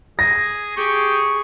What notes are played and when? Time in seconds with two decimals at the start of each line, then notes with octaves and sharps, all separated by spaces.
0.19 G#4 A#6
0.77 G4 G#4 C#6